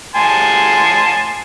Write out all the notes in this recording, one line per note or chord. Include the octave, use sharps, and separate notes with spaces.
G#5 A5 C6